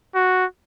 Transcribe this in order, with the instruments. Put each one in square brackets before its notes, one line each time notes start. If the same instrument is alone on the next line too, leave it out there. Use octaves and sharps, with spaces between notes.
[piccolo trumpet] F#4